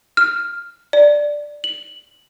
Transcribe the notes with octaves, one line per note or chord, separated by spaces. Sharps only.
F6
D5
F#7